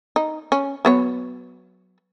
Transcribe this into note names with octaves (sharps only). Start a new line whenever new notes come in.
D#4
C#4
F#3 B3 C#5